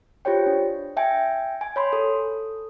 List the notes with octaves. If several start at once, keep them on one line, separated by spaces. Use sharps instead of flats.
F4 G4 C5 C#5 G5
D4
E5 G5 G#5
G#5
C#5 B5 C6
A4